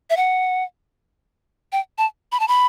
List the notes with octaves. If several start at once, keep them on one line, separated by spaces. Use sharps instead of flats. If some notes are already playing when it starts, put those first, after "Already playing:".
E5
F#5
G5
A5
B5
A5
B5